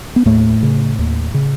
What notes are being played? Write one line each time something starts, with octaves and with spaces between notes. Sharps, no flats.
B3
D#2 A2 A3
C#3
D#2
C#3